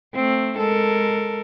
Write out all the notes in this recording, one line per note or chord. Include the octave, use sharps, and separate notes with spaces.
A3 C4
G#3 A4 A#4